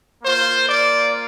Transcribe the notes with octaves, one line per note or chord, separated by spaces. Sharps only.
A#3 F4 C5
D5